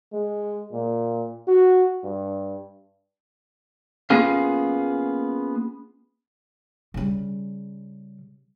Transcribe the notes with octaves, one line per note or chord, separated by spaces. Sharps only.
G#3
A#2
F#4
G2
A#3 B3 C#4 F4 G#4 F5
C#3 G3